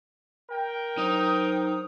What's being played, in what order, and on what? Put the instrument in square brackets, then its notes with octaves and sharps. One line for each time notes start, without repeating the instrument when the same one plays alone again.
[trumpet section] A#4 G5
[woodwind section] F#3 C5 D#6 [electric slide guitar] D#4 A#5